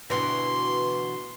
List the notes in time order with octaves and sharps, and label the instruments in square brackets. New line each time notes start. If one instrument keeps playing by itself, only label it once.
[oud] D2 B2 E3 [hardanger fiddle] C6